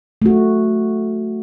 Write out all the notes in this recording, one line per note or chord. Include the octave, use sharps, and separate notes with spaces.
A3 F#4